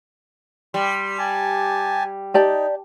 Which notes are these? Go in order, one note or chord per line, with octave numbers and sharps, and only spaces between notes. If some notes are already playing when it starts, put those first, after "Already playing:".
G3 C6
G4 G#5 A5
D#4 G4 D5 A5